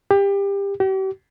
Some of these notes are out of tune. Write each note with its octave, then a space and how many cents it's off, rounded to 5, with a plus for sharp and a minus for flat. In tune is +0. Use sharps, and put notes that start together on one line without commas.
G4 +25
G4 -40